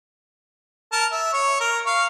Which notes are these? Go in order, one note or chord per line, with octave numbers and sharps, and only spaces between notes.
A#4 A5
E5
C#5
A#4
F5 C#6